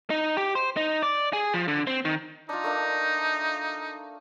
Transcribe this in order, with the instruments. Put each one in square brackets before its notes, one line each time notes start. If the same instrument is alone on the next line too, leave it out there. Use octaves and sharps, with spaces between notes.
[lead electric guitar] D#4
G4
C5
D#4
D5
G#4
F3
D3
C4
D#3
[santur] D4 F4 [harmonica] D#4
[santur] A3 A#3 D4